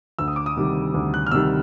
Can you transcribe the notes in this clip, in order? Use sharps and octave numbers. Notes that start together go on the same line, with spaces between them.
D2 E6
D#6
D6
D#6
C3 D#3 G3
D2
F#6
F6
C3 D#3 G3 E6